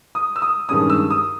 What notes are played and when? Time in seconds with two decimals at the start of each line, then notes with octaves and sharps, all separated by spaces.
0.15 D#6
0.36 E6
0.42 D#6
0.69 G2 D#3 G#3 C#4 D#6
0.90 E6
1.10 D#6